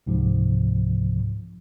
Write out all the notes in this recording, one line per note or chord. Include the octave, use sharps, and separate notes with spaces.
C#2 G#2 C3 F3